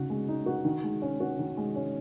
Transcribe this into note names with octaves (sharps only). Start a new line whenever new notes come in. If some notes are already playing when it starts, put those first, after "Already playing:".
Already playing: C#3 D#4 F#4
G#3
D#4
F#4
D#3
G#3
C#4
F#4
D#3
G#3
C#4